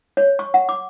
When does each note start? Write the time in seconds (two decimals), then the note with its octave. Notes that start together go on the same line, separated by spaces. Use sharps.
0.17 C#5
0.39 C#6
0.54 F#5
0.69 D6